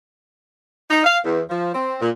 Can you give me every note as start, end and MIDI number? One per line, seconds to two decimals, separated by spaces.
0.90 1.02 63
1.05 1.18 77
1.24 1.41 40
1.50 1.72 53
1.74 1.96 60
2.02 2.09 46